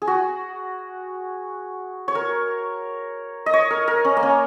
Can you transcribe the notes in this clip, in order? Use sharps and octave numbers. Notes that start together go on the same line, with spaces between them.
G#4
F#4
C#5
A#4
D#5
C#5
A#4
A#4
C#4
A#3
C#4